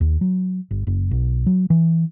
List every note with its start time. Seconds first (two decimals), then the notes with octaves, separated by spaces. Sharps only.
0.01 D#2
0.21 F#3
0.71 G1
0.87 F#1
1.11 B1
1.46 F#3
1.70 E3